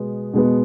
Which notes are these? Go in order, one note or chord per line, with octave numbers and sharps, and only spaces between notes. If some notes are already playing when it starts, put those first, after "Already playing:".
Already playing: B2 G#3 B3
B2 G#3 B3